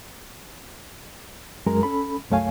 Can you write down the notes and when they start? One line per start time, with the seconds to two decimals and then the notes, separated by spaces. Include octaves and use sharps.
1.66 F#2 G#3 A#4 A#5
1.83 C#4 A4 B5
2.30 C2 F#2 A3 C#5 F5 G#5